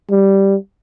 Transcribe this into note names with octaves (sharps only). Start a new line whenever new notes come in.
G3